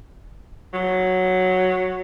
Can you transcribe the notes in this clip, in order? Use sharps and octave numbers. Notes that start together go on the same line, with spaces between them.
F#3